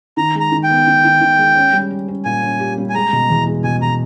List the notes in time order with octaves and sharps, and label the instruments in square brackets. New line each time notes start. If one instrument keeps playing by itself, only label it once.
[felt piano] D#3 [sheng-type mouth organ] A#5
[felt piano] G#3 [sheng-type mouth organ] A#5
[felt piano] D#3
[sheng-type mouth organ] G5
[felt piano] B3
D#3
D#3
D#3
G#3
C#4
G3
G4
C#4
[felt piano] A#2 [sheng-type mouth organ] G#5
[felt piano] C#4
G4
G3
[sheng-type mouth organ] G#5
[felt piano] G#3 [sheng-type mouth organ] A#5
[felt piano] B2
E2
G#3
[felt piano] B2 [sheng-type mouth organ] G#5
[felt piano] B2 [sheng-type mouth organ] A#5